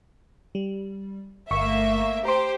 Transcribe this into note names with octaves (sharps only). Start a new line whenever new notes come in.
G3
G1 A3 A#3 E5 C#6
G4 C5 A#5 C6